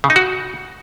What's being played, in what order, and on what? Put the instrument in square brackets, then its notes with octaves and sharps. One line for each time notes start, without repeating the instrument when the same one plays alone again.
[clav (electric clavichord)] C#3
D#4
F#4